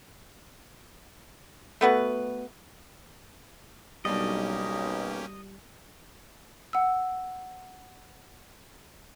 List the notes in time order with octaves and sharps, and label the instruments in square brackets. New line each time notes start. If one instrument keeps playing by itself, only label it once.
[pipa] A3 B3 F#4 B4
[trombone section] B1 [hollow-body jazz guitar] G3 D4 [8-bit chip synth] A#3 C#4 G4 [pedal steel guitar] D#5
[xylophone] F#5 E6